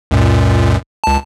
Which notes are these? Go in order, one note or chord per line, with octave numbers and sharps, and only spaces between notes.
C#2 F#2 A#2
C#2 A5